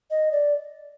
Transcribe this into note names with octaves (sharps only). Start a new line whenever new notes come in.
D#5
D5